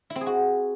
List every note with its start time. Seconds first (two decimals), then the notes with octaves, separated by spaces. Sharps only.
0.10 E4
0.16 C4
0.21 G#4
0.26 F#4